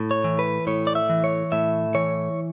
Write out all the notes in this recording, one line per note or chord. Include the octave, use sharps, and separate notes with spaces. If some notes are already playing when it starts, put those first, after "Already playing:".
Already playing: A2
C#5
E3
B4
A2 C#5
D5
E5
E3
C#5
A2 E5
E3 C#5